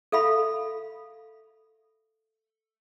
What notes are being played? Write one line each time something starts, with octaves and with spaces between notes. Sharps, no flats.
A4 E5 F5 B5